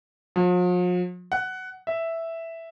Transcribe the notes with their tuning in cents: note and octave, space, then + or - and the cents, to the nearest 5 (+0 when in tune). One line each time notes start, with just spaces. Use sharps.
F3 +45
F#5 +10
E5 +0